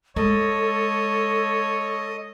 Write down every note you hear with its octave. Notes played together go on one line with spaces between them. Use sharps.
G#3 A4 C#5 D#5